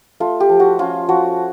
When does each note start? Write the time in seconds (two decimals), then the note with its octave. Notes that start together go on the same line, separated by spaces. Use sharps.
0.20 A3 F4
0.40 G4
0.49 F3
0.60 F#4
0.79 C#4 F4
1.09 F3 F#4